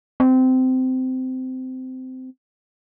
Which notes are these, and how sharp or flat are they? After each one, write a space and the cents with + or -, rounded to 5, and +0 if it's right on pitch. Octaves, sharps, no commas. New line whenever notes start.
C4 -20